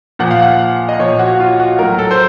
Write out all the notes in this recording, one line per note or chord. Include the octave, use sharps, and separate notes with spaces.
A#2 F3 F#5
F5
F#5
D#5
A#2 F3 C#5
F#4
F4
F#4
A2 F#3 A#4
A4
C5